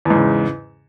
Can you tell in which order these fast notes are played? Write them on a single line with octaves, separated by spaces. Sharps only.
E2 G#2 C#3